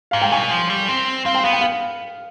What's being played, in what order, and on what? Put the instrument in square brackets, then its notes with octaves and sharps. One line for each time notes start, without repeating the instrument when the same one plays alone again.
[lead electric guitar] G#2 [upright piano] F5
[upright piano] G5
[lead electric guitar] B2 [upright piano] G#5
[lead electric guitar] F3
G3
C4
[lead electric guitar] C4 [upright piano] F5
[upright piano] G5
[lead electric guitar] B3 [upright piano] F5
[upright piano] G5
F5